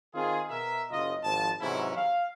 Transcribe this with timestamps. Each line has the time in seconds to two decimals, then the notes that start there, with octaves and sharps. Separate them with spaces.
0.15 D#3 C4 F4 G#4
0.50 B2 A#4 E5
0.91 F#1 C#3 F4 D#5
1.24 G#1 F3 A5
1.61 G#2 C3 E3 F#3 C#4 E4
1.96 F5